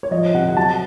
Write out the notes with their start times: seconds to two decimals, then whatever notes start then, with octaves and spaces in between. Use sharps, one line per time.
0.03 C#5
0.11 F3 D#5
0.34 C3 F#5
0.49 F#5
0.57 F#3 A5